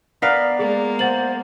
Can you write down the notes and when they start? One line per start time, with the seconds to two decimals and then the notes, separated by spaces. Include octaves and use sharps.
0.22 B3 A#4 D5 F5 B6
0.59 G#3 A#3 G#4
0.99 C5 F#5 A6 F#7